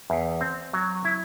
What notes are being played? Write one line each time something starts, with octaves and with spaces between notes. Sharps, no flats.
E2
C4
F#3
E4